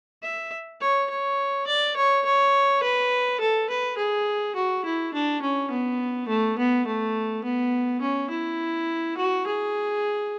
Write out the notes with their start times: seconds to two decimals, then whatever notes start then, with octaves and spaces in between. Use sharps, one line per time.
0.22 E5
0.80 C#5
1.10 C#5
1.67 D5
1.96 C#5
2.25 C#5
2.82 B4
3.40 A4
3.69 B4
3.97 G#4
4.55 F#4
4.85 E4
5.13 D4
5.41 C#4
5.70 B3
6.28 A3
6.58 B3
6.87 A3
7.44 B3
8.01 C#4
8.30 E4
9.17 F#4
9.46 G#4